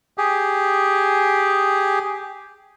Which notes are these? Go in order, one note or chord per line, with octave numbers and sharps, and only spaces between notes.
G4 G#4